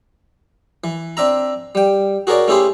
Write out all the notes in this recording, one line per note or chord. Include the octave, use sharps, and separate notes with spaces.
E3
C4 D4 E5 A#5
G3 G5
F#4 G#4 A#4 C#5 D5
A3 C#4 E4 G4 G#4 C5